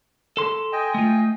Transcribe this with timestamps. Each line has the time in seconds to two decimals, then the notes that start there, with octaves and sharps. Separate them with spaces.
0.37 A4 C6
0.73 D#5 G5 G#5
0.94 A3 F4